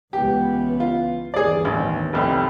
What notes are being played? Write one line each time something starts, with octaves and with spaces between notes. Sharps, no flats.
C#2 E3 B3 G4
F4
G1 D#2 E3 G#4 D5
A1
F1 C2 G4